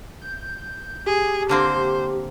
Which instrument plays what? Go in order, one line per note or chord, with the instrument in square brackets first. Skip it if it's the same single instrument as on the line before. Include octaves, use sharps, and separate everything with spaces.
[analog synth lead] G6
[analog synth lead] G4 [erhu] G#4
[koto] D3 A#3 C4 [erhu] C5